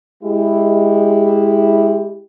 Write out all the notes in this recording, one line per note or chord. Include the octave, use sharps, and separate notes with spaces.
G#3 E4 G4